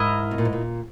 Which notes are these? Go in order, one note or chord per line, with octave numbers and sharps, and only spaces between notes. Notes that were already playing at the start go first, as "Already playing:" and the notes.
Already playing: G#2 E4 A#4 D#5
B2
A#2
G#2
A#2